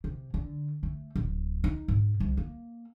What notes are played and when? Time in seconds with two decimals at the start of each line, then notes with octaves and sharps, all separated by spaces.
0.04 C3
0.34 D3
0.83 A3
1.16 D1
1.64 D#4
1.88 G#2
2.20 C2
2.37 A#3